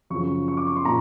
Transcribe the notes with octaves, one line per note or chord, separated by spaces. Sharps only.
F#2 C#3 F3 C#6
C#6
D6
C#6
C6
A#2 A#5